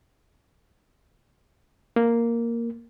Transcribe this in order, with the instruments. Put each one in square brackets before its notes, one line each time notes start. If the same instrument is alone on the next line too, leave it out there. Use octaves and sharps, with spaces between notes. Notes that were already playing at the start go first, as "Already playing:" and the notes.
[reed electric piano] A#3